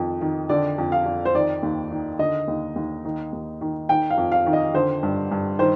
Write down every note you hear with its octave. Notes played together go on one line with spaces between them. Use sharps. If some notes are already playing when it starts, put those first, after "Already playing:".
Already playing: F2 D#3
D#3
D3 D5
F2
F5
F2
C5
D#3 D5
D#2
D#3
D3 D#5
D#2
D#2
D#3
D#2
D#3
D#3 G5
F5
F2
F5
D#3
D#5
D3 C5
G2
G2
D#3 C5